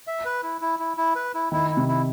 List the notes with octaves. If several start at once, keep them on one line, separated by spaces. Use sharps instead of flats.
E5
B4
E4
E4
E4
E4
B4
E4
D#3 E4
E4
C3
E4